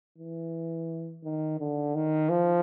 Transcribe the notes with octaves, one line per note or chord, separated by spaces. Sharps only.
E3
D#3
D3
D#3
F3